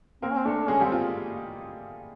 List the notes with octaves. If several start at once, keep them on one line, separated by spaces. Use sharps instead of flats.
A#3 C4 A#4
C#4
C4
A3 D4 A4
G#3 C#4 G#4
G3 C4 G4
F4